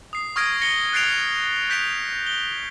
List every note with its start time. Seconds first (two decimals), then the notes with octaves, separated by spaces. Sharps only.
0.13 D#6 C7
0.36 C#6 D#6 F6 G#6 A#6 D7
0.61 A#6 C#7 G7
0.93 F#6 A6 C7 D7 F7
1.70 G6 B6 D7 F7
2.27 G7